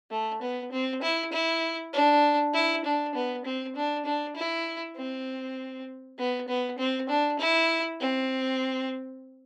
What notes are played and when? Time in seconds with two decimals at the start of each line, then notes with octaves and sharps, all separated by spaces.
0.11 A3
0.42 B3
0.72 C4
1.02 E4
1.33 E4
1.93 D4
2.54 E4
2.85 D4
3.14 B3
3.45 C4
3.76 D4
4.06 D4
4.36 E4
4.96 C4
6.18 B3
6.48 B3
6.78 C4
7.09 D4
7.39 E4
8.00 C4